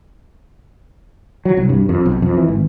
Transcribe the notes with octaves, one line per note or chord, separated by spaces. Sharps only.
F#3
C2
G2
F2
B1
F2
E3
G#1